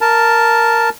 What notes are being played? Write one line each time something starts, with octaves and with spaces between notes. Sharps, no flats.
A#4 A5